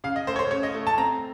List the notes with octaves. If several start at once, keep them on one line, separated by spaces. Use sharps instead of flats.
C#3 F5
D#5
A3 C5
C#5
C5
C#3 C#5
D#5
A3
A5
C4 A#5